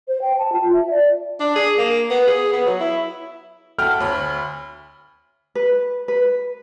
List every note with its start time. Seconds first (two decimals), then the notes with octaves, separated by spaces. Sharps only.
0.08 C5
0.21 G5
0.39 A5
0.53 F4
0.73 E5
0.90 D5
1.40 D4
1.55 G#4
1.78 A#3
2.10 B3
2.27 G#4
2.53 B3
2.66 F#3
2.80 E4
3.79 A3 F#4 G5 A5 F6
4.00 D2 C#5 B5
5.55 B4
6.08 B4